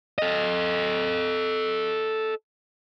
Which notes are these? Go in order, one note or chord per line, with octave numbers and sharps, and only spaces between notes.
A4 D#5